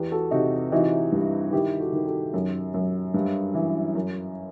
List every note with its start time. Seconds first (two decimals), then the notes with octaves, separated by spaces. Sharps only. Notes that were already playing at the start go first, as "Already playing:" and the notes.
Already playing: E2 G4 B4
0.11 F#4 A4
0.31 C3 D#4 F#4
0.72 E3 D#4 F#4
1.12 G2
1.52 D#3 E4 G4
1.80 F#4 A4
1.93 D#3
2.06 F#4 A4
2.33 F#2
2.74 F#2
3.14 G2
3.54 E3
3.95 F#2